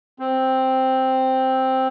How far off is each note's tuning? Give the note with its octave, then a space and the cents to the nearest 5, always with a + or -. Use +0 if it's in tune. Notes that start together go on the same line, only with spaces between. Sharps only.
C4 +0